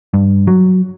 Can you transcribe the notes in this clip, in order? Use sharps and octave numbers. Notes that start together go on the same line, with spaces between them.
G2
F#3